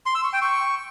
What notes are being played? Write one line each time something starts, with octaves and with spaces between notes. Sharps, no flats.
C6
E6
C#6
G5
C#6